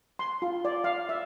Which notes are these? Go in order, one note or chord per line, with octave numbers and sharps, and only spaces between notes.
C6
F4
D5
F5
E5